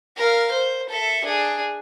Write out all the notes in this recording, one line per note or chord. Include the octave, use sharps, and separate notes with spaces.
A#4 F5
C5
A4 E5
D4 G#4